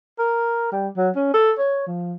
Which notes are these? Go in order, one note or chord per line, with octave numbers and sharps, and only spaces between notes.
A#4
G3
F#3
C#4
A4
C#5
F3